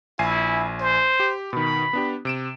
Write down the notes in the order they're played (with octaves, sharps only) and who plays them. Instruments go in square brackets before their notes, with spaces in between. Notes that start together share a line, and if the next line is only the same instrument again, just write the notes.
[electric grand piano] A#1 G#5 C7 [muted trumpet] E4
[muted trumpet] C5
[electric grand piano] G4
[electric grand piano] B2 D#3 [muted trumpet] B5
[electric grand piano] B3 D4 G4
C3 D7 E7